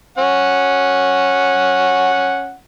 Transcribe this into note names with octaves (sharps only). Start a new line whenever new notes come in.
C#4 F#5